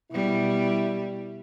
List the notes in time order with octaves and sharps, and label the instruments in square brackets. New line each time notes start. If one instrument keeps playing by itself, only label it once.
[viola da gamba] B2 G3 [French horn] E4